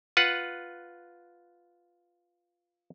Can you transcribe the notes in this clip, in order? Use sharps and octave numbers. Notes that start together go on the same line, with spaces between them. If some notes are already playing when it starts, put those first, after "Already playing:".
F4 B4 F#5